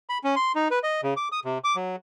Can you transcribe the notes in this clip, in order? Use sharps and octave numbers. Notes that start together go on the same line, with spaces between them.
B5
C#4
C6
D#4
B4
D#5
C#3
D6
D#6
C3
D6
F#3